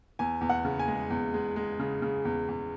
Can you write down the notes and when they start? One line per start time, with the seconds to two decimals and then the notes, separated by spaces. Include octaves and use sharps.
0.19 E2 G#5
0.41 E2
0.50 F#5
0.65 C#3
0.79 G#5
0.88 G#3
1.10 E2
1.34 G#3
1.56 G#3
1.79 C#3
2.02 C#3
2.25 E2
2.49 E2